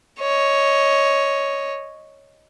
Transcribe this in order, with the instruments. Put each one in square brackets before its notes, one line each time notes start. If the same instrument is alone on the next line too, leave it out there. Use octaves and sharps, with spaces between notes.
[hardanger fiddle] C#5 D#5